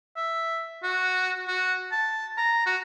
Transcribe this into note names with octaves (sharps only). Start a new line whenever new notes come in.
E5
F#4
F#4
A5
A#5
F#4